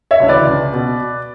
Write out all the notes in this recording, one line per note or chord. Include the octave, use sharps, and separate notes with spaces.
C#5 E5
D2 C#3 E3
B4 D5
C#2
B2